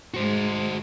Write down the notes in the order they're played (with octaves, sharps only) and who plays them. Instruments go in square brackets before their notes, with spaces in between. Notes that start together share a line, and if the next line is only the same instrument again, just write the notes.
[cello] G#2 G#3 [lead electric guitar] F#4 C5